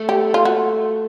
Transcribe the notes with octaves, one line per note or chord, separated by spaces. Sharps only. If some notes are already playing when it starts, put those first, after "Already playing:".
Already playing: A3
G4
F4
F#4